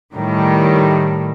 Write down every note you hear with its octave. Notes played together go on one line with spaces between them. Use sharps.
A2 D#3 G3